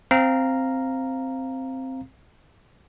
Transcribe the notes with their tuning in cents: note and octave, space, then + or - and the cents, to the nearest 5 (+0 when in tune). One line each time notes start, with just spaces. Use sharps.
C4 +0 F5 -5 A#5 +0